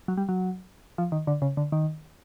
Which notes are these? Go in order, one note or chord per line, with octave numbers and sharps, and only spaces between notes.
F#3
G3
F#3
F3
D#3
D3
C#3
D3
D#3